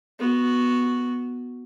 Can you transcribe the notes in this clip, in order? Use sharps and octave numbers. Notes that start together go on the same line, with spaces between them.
B3 F#4